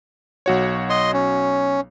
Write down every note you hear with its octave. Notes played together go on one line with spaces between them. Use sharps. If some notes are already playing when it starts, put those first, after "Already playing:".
B1 F#4 C#5
D#5 C6
C#4